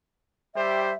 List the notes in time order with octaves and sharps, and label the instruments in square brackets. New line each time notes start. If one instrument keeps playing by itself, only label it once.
[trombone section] G3 G4 C5 [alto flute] E5